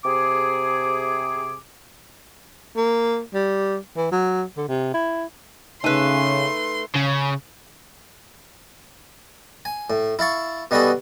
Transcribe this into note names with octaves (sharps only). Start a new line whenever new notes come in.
C3 G#4 D6
A#3
G3
E3
F#3
D3
C3
E4
C#3 A3 D#4 B4 C6 D#7
C#3
G#5
A2
E4 F5 A5 C#6
B2 G3 B3 F#4 G#4 A4